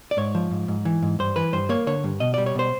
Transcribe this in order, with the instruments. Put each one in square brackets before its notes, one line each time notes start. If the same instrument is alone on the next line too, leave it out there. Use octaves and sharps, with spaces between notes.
[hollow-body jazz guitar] D5
G#2 C#5
F3
G#2
G#2
E3
G#2
G2 C5
E3 B4
G2 C5
A#3 C#5
D3 C#5
G2
B2 D#5
G3 D5
C#5
B2 C5